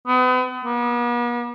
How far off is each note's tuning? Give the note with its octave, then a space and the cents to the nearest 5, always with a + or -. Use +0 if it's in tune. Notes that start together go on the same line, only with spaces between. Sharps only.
B3 +40
B3 -45